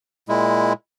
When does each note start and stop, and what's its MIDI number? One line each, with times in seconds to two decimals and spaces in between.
0.29 0.73 46
0.29 0.73 56
0.29 0.73 64